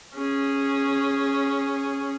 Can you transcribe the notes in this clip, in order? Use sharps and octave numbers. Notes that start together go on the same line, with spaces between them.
C#4 G#4